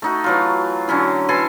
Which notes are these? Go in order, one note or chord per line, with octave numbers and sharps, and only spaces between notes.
A3 D#4 F#4
E3 F#3 F4
D3 F#3 C#4 E4
E3 A4 G#5 C6